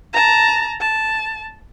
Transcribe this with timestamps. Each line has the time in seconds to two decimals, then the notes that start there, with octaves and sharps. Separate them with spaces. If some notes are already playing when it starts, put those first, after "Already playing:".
0.13 A5 A#5
0.80 A5